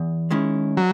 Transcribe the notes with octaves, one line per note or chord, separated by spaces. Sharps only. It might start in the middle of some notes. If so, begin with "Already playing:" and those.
Already playing: E2
D#3 G#3 C#4 E4
F#3